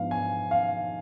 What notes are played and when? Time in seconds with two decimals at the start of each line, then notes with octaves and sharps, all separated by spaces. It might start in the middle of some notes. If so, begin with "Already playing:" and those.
Already playing: G#2 F3 B3 D4 F5
0.11 G#5
0.51 F5